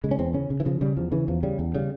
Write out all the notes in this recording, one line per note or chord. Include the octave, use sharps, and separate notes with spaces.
C#3 G#3
C#4
E2 C4
C#3 C#4
C#3
E3
C#3 F3
C#3 G3
E2 F3
C#3 E3
E2 F3
C#3 G3
E2
C#3 G3